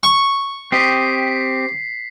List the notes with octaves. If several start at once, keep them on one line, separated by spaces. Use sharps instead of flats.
C#6
C4 G4 D#5 B6 C7